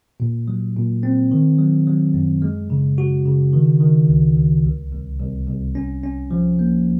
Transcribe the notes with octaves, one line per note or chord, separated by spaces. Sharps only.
A#2
F#3
A#2
C4
D#3
F#3
F#3
F#2
G#3
C#3
F#4
C#3
D#3
D#3
C#2
C#2
C2
C2
C2
C2
C#4
C#4
F3
A#3